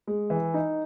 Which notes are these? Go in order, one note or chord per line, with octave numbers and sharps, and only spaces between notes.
G#3
E3
D#4